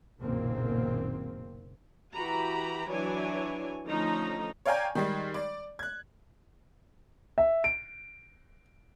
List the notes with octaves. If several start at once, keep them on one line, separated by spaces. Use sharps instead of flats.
F#1 B1 A#2 D#3 A#3 C4
E3 F#4 G4 A#5 B5
E3 F#3 D4 E4 C#5 G#5
D3 F3 A3 C#4 D#4 A#5
C#5 D5 F5 G5 G#5 A#5
D#3 G3 G#3
D5
F#6 G#6
E5
D7